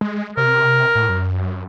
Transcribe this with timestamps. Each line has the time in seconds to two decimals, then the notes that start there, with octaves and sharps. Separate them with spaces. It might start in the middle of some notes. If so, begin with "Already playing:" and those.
0.01 G#3
0.37 C3 A#4
0.95 A2
1.09 F#2